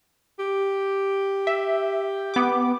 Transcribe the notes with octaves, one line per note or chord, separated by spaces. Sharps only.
G4
E5
B3 D6